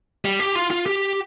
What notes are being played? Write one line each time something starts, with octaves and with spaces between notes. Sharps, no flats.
G3
G4
F4
F4
G4